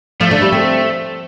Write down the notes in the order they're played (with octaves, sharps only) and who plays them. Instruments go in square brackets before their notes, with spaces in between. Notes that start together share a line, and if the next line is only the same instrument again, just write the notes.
[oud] F3 [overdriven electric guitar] A3
[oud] D3
G3
C4